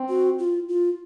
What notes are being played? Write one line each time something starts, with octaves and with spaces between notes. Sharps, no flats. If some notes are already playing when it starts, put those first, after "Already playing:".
Already playing: C4
F#4
F4
F4